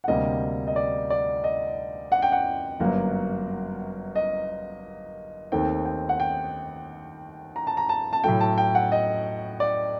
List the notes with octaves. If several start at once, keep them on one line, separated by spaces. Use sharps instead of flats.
F#5
D2 C3 G3 A#3 D#5
D#5
D5
D5
D#5
F#5
G5
F#5
G1 F#2 F#3 A#3
D#5
D#2 D#3 A3 C4 D#4 G5
G5
F#5
G5
A#5
A5
A#5
A5
A5
A2 F#3 A3 G5
A5
G5
F#5
D#5
D5